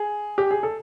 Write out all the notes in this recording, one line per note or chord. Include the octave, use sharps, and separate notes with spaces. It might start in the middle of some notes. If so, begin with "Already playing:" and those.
Already playing: G#4
G4
G#4
A4